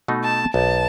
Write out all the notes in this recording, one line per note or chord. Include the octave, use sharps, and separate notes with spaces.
B2 A3 D#4 F#4
A5
B1 A5